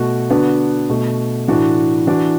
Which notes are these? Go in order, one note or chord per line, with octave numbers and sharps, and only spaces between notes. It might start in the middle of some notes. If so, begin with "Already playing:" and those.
Already playing: B2 A3 F#4
D3 B3 D4 F#4
B2 A3 F#4
A2 E3 D4 F#4
E3 D4 F#4